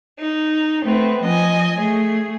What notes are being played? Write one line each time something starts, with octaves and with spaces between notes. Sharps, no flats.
D#4
A3 B3 C4
F3 D#5 G#5
A3 G#4